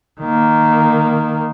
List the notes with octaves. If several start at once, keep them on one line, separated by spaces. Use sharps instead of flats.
D#3 A#3